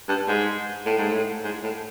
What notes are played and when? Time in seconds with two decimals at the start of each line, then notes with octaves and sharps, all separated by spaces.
0.08 G2
0.28 G#2
0.86 A2
0.98 G#2
1.12 A2
1.44 G#2
1.63 A2